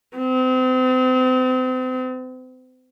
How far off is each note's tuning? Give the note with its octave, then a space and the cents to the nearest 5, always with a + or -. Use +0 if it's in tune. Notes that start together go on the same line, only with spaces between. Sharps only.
C4 -35